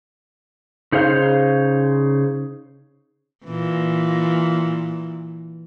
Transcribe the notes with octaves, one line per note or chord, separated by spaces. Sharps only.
C#3 D#4 G#4 C5 F5
A#2 E3